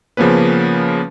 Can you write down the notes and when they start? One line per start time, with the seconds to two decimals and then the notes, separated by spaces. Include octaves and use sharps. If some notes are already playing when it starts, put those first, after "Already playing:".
0.17 C#3 F3 A#3 B3 C#4 B4